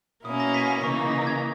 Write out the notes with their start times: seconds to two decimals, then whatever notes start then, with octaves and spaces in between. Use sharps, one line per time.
0.24 B2 A#3 C#4 E4 D#6
0.40 A#6
0.54 B6
0.68 B6
0.83 C#3 E3 A#3 D#4 C#6
1.12 A#6
1.27 G#6